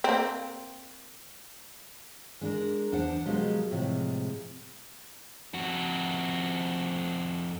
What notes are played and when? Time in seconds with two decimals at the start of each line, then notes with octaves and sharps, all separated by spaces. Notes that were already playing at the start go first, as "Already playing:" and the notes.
0.04 A#3 C4
2.41 G#3 D4 A#4
2.92 E2 D4 C5 F#5
3.26 B2 F3 F#3 G#3 G4 A#4
3.71 A2 C3 F3 G#3
5.54 F2 F#4